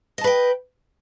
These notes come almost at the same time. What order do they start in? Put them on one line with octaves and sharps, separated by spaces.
D#5 A5 B4 G5